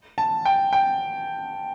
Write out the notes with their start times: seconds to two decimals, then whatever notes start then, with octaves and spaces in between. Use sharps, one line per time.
0.18 A5
0.45 G5
0.73 G5